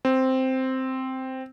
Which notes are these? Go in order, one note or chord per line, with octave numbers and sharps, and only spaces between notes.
C4